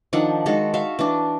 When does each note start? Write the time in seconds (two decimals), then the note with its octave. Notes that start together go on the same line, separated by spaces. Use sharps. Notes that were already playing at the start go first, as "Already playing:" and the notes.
0.13 D#3 F3 D4 F#5
0.46 D#3 G#3 F#4 A4
0.74 F#4 E5 F5
0.99 E3 D4